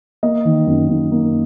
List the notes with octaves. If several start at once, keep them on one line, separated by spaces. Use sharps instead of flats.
A#3 D#5
D#3
F#2
F#2
A#3